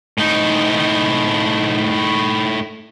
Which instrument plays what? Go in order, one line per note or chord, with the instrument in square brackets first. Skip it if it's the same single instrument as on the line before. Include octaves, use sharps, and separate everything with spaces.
[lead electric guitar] A2 D#4